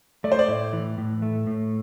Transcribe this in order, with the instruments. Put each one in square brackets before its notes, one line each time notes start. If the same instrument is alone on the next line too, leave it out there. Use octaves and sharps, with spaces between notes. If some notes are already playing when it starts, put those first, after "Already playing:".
[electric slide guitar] A3 [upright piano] D5
[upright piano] C5
D5
[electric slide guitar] A2
E3
A2
A3
A2